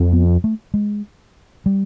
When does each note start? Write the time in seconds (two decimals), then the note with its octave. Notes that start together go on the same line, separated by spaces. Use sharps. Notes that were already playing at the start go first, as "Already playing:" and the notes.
Already playing: F2
0.13 B3
0.44 A3
0.74 G#3
1.66 G3